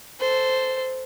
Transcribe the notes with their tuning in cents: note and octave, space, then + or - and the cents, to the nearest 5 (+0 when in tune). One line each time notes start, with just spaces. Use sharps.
A4 +0 C5 -10